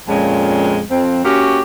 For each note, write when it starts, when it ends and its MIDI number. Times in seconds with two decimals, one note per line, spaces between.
0.07 0.80 41
0.07 0.80 46
0.07 0.80 56
0.07 0.80 61
0.90 1.19 41
0.90 1.19 60
1.23 1.60 58
1.23 1.60 61
1.23 1.60 66
1.23 1.60 67